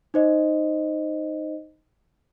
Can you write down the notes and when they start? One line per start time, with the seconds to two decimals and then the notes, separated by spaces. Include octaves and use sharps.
0.14 D#4 C5 D#5